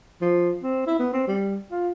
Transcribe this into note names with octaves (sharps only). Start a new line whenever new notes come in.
F3
C4
E4
B3
C4
G3
F4